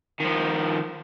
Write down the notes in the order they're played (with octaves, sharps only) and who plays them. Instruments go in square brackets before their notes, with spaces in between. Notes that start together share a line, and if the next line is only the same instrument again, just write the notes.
[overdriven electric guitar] D#3 F3